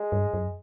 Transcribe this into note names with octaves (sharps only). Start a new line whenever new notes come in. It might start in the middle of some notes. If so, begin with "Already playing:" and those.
Already playing: G#3
G2
F#2